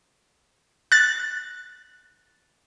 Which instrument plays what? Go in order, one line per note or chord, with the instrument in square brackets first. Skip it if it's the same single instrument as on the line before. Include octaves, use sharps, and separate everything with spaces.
[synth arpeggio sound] F#6 A6